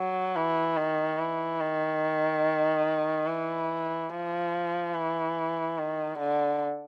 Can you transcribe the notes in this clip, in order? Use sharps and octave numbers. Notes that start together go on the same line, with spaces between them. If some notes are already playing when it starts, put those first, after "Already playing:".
Already playing: F#3
E3
D#3
E3
D#3
E3
F3
E3
D#3
D3